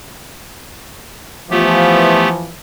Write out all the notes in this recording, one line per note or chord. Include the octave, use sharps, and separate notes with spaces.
E3 F3 A3 B3 G4